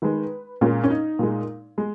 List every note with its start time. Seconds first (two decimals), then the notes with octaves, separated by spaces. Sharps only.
0.02 D#3 G#3 B4
0.61 A#2 G#3 C#4
0.84 C#4
0.90 D#4
1.19 A#2 G#3
1.78 G#3